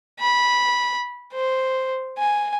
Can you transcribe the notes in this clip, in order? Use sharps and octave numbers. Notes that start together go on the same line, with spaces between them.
B5
C5
G#5